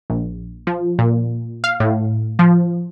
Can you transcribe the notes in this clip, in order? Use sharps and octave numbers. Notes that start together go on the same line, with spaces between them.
A#1
F3
A#2
F5
A2
F3